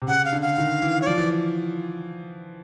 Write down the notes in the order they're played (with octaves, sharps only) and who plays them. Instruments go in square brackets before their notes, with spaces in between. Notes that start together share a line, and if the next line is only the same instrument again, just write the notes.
[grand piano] C3
[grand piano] C#3 [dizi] F#5
[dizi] F5
[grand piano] D3
[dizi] F5
[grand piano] D#3
E3
[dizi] C#5
[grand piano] F3 [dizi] D5
[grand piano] E3